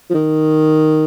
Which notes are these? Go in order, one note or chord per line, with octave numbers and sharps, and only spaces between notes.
F3
D#3